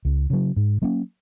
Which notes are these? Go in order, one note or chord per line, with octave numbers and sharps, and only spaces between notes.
C#2
C#3 F#3
G#2
F#3 A#3 C#4